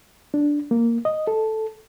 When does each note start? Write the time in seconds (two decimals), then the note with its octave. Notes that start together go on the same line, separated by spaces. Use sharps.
0.34 D4
0.71 A#3
1.05 D#5
1.27 A4